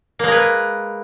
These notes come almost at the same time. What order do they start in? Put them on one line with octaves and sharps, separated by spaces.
A#3 G#3 A#4 B4